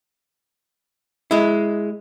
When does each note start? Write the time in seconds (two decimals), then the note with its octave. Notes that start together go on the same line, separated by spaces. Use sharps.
1.31 G#3 E4